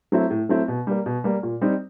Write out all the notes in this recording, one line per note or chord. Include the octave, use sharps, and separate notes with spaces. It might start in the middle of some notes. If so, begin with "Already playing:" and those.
F#3 A3 C4 E4
A2
F#3 A3 C4 E4
B2
G3 A#3
B2
G3 A#3
A#2
G3 C4 D#4